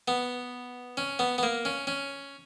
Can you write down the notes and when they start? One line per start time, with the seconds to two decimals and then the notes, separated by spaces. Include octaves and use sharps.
0.08 B3
0.97 C#4
1.19 B3
1.38 B3
1.43 A#3
1.65 C#4
1.87 C#4